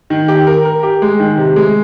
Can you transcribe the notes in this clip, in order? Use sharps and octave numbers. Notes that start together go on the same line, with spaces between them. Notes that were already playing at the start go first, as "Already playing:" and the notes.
D#3
G4
A#4
A#4
G4
G#3
D#3
C3
G#3